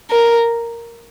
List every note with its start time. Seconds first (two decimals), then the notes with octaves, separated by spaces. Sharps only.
0.11 A#4